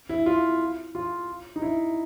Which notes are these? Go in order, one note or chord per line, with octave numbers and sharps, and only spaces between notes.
E4
F4
F4
D#4
E4